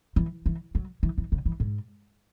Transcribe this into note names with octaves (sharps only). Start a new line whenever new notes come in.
E3
E3
F#3
E3
E3
C#3
E3
G#2